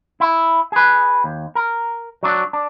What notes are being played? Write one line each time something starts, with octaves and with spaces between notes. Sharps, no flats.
E4
G#4 B4
D#2
A#4
F#3 D4
D4